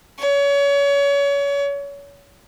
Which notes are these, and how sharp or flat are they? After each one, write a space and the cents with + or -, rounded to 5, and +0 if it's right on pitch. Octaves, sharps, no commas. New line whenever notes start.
C#5 +30